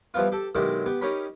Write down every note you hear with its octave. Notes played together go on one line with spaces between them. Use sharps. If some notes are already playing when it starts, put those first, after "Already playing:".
E3 F3 G3 B3 F4
G4 A4
B1 D#3 F#3 G#3 E4 G4
B3 G4
C#4 D#4 G4 A#4 C#5 B5